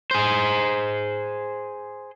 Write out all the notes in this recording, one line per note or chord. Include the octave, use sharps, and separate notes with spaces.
G#4 C5